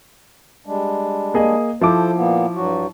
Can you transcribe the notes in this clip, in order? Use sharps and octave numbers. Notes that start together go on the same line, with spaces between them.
G3 G#3 D4
A#3 G#4 D#5
F3 E4 A4 C5 D6
A#2 A#3 B3
G2 F#3 F#4